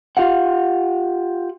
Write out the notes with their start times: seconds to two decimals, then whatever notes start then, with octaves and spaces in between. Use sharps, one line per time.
0.17 F4 G4 F5 F#5